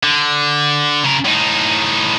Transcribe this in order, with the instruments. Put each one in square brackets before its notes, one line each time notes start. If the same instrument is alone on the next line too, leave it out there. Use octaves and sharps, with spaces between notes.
[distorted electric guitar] D3
C#3 A#4
A2 D#4